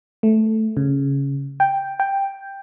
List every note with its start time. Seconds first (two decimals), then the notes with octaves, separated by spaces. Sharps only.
0.23 A3
0.77 C#3
1.60 G5
2.00 G5